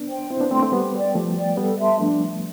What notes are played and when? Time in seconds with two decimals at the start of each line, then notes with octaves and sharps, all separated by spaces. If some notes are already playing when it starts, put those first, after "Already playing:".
Already playing: B3 D4
0.08 C5 G5
0.30 C4 E4 C5
0.40 B3 D4
0.51 A3 C4 G5 C6
0.62 A3 C4
0.72 G3 B3 G4
0.93 D5 G5
1.15 F3 A3 G4
1.36 D5 G5
1.57 G3 B3 A4
1.78 E5 A5 C6
2.00 F3 A3 D4